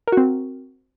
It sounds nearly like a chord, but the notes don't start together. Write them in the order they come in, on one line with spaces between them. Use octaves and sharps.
A#4 F#4 C4